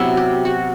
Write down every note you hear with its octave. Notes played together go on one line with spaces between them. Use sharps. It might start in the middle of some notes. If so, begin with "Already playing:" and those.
Already playing: C3 F#3 B3 E4
G4
F#4